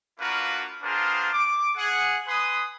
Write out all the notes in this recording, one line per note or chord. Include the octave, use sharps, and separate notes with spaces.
A#3 D4 F4 F#4 A#4 B4
B3 D4 F4 G#4 A#4 C5
D6
G#4 F#5
B4 G#5 C6 D#6